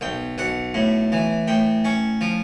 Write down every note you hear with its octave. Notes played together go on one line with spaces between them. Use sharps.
B1 G5
B1 F#5
A2
E3
A2 G5
C#4
F3